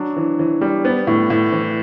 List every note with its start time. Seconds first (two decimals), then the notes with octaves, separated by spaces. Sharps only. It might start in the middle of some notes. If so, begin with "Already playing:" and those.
Already playing: F#3 D4
0.16 E3
0.39 E3
0.61 G3
0.85 B3
1.07 A2
1.30 A2
1.52 E3